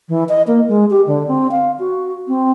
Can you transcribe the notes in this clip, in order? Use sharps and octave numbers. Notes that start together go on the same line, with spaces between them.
E3
D#5
A#3
G#3
G4
D3
C4
F5
F#4
C4